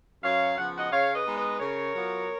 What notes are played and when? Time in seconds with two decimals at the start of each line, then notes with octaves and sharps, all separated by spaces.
0.23 F#2 C#5 F5
0.57 C#3 F3 B3 F#5
0.78 D#5 F#5
0.92 C#3 C#5 F5
1.15 B4 D#5
1.26 G#3 B3 D#4
1.37 B4 D#5
1.60 C#3 A#4 C#5
1.95 F#3 B3 F4